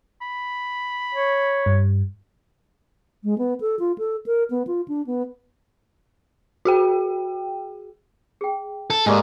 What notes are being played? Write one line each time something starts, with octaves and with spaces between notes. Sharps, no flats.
B5
C#5
G2
G#3
B3
A4
F4
A4
A#4
B3
F4
D4
B3
F#4 G#4 G5
G#4 G5
A4
G#2 G#3 A#3 G4 A4 D5